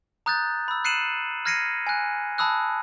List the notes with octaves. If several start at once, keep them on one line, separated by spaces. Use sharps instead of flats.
A#5 D#6 F#6 G6 A6
B5 E6
F#6 C7 C#7 D#7 E7 F#7
F6 G#6 A#6 C7 C#7 D#7
G#5 F#6
A5 B5 D#6 E6 F#6